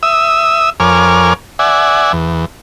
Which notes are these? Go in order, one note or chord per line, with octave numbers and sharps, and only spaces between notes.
E5 D#6 E6
F2 A#4 C#5 G#5 D6 F6
D5 E5 F#5 G#5
E2